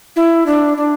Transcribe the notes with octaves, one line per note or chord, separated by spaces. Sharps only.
E4
D4
D4